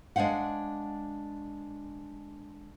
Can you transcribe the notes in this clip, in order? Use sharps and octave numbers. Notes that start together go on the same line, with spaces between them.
G#3 D4 C5 F5 F#5